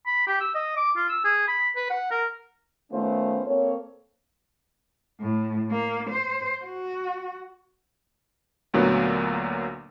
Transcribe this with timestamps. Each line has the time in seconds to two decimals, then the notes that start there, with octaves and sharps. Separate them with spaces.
0.06 B5
0.27 G4
0.41 E6
0.55 D#5
0.77 D6
0.97 F4
1.09 E6
1.25 G#4
1.48 B5
1.76 B4
1.90 F#5
2.11 A#4
2.92 D#3 A3 B3 C#4 F4 C5
3.46 A#3 C4 A4 C#5
5.20 A2
5.71 A#3
6.10 C5
6.64 F#4
8.74 D2 A#2 F#3 B3